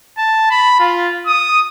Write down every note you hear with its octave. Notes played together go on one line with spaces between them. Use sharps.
A5
B5
F4
D#6